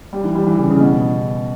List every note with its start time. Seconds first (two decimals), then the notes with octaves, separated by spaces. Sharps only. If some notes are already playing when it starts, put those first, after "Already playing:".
0.13 G3
0.24 E3
0.35 G3
0.47 E3
0.58 C#3
0.69 C#3
0.80 B2